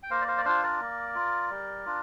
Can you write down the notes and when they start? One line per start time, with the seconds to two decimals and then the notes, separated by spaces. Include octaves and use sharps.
0.03 G5
0.10 A#3 C5 F5
0.21 D5
0.28 C5 F5
0.38 D5
0.45 D4 F4 C5 F5
0.63 A#4 D5
0.81 A#3
1.15 F4
1.50 G3
1.86 D4 F4